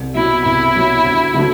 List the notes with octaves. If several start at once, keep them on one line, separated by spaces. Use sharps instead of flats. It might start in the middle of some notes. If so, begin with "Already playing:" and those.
Already playing: C2
B2 F#3 E4
C2 E4
B2 F#3
D2
D3 F#3 A3